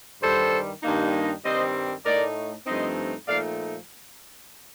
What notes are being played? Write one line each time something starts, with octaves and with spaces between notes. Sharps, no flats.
G2 D#3 G3 A4 C5
G2 D#3 G3 A#3 D#4
G2 D#3 G3 C4 C5 D#5
A2 A3 D#4 A#4 D5
G2 F3 A3 C4 D#4 C5 D#5
A#2 F3 A3 D#4 D5 F5